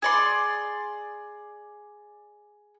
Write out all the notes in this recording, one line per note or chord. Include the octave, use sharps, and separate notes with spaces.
G#4 D5 C6